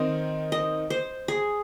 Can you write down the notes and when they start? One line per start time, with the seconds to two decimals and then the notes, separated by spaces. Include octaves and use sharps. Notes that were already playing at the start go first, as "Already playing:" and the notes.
Already playing: D#3 C4 D#4 A#4 C5 D#5
0.52 D#5
0.90 C5
1.28 G#4